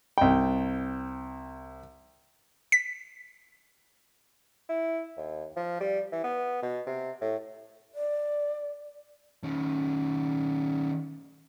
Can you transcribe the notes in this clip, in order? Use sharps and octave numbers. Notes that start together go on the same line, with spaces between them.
C2 G5
B6
E4
D#2
F3
G3
E3
B3
B2
C3
A2
D5
D#3 C#4